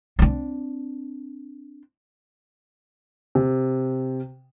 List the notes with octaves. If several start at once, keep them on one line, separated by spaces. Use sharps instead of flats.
C4 D4
C3